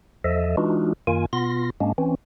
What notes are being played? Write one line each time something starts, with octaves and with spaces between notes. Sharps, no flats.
E2 F3 A4 D#5 E5
E3 G#3 D4 D#4 F4 F#4
F#2 D#3 A#3 F4 G#5
B2 B3 F4 C6 A#6
G#2 G#3 A#3 C#4 D4
E3 C4 C#4